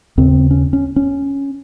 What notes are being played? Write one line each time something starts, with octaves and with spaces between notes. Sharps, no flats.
D#2 C#3 C4
C#4
C#4
C#4